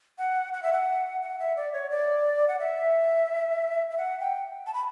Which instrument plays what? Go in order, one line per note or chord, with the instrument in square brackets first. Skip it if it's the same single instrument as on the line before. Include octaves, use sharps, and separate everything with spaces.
[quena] F#5
F#5
E5
F#5
F#5
E5
D5
C#5
D5
F#5
E5
E5
F#5
G5
A5
B5